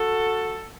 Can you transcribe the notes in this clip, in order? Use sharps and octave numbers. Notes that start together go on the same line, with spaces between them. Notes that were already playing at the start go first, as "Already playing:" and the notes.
Already playing: F#4 A4